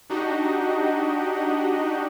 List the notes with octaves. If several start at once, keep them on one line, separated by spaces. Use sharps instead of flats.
D4 D#4 F#4 G4 D#5